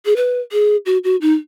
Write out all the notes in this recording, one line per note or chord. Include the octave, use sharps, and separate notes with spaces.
G#4
B4
G#4
F#4
F#4
D#4